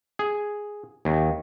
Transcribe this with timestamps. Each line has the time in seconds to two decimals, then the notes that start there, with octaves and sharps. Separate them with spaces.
0.19 G#4
1.05 D#2